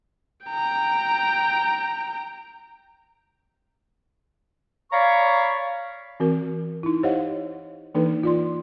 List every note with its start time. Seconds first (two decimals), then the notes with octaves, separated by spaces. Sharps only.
0.46 G5 A#5
4.92 C#5 D5 F5 A#5 B5 C#6
6.20 E3 C4 F#4 A#4
6.83 D#4 E4
7.03 G4 C5 C#5 D#5 F5 F#5
7.95 E3 A#3 D4 D#4 A4 B4
8.23 F4 D5 C6